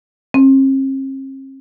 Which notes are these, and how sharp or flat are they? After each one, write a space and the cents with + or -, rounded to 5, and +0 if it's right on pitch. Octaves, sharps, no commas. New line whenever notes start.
C4 +45